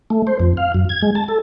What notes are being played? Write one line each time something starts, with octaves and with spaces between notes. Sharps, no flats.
A3
C5
F2
F5
F#2
G#6
G#3
A5
A4